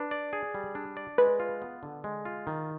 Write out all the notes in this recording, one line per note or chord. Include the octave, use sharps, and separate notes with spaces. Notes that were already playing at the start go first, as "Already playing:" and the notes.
Already playing: D4 B4
D5
G#4
G3
D4
D5
G#3 B4
F4
B3
D3
G#3
F4
D#3